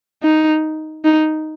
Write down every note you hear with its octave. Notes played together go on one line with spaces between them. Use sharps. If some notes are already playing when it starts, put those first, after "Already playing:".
D#4
D#4